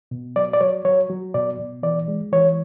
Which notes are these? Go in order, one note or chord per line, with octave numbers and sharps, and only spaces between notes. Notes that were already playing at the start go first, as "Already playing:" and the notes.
B2
F#3 D5
D5
F#3 C#5
F#3 C#5
F#3
B2 D5
B2
E3 D5
G#3
E3 C#5